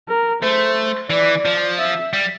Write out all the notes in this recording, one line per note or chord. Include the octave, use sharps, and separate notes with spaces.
A#4
A3 C5
E3 D5
F3
E5
G3